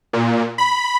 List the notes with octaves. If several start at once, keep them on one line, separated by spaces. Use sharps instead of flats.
A#2
B5